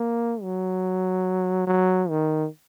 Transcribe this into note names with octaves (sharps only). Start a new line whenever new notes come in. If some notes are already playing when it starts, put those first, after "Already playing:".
Already playing: A#3
F#3
F#3
D#3